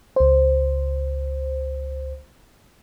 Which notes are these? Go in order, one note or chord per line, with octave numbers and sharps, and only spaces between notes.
C#2 C5